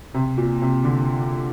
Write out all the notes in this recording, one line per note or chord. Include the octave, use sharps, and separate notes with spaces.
C3
A#2
C3
D3